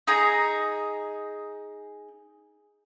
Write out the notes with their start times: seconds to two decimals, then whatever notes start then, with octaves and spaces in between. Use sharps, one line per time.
0.07 D#4 G#4 A#5